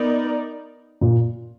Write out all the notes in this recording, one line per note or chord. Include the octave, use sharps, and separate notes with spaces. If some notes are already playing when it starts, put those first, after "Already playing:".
Already playing: B3 D#4 A#4 D5
A#2